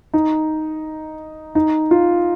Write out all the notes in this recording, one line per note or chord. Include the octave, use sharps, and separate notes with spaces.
D#4
D#4
F4